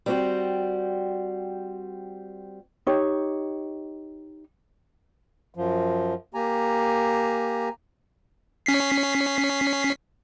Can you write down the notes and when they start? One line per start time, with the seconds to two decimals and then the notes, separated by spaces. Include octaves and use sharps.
0.06 G3 C4 F#4
2.87 D#4 G4 C#5
5.54 F#2 F3
6.34 A#3 G4 G#5 A#5
8.66 C#4 B6 C7